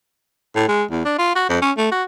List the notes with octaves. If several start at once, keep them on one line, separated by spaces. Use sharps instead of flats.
A2
G#3
E2
D4
F4
F#4
F2
C#4
A3
F#4